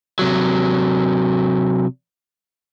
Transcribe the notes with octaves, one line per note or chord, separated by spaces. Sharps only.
C3 F#3